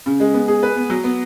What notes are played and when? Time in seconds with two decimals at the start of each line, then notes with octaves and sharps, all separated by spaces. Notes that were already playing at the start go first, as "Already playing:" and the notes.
0.06 C#3
0.20 G#3
0.34 B3
0.48 G#4
0.63 B4
0.76 B3
0.90 F#3
1.04 B3